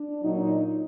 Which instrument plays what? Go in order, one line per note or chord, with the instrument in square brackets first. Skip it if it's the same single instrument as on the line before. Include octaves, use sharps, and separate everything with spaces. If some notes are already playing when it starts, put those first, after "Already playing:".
Already playing: [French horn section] D4
A#2 F#3 D#4